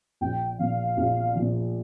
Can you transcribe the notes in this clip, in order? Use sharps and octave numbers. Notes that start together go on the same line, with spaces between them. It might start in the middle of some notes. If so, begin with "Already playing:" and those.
A#1 G5
A#2 F3 F5
A#1
A#2 F3